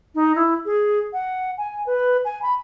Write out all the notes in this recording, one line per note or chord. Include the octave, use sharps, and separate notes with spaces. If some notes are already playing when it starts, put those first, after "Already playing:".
D#4
E4
G#4
F#5
G#5
B4
G#5
B5